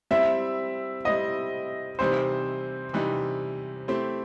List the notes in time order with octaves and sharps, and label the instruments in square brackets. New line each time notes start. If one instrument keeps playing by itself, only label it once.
[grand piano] G3 C4 E4 [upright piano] E5
[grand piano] G3 C4 E4 [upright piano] D#5
[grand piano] C3 E3 G3 D#4 [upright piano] C5
[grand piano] C3 E3 G3 D#4
A3 C4 E4 G4 C5